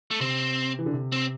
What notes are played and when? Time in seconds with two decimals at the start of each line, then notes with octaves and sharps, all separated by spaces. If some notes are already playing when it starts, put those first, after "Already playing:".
0.11 A3
0.20 C3 C4
0.79 E3
0.86 D3
0.94 C3
1.12 C4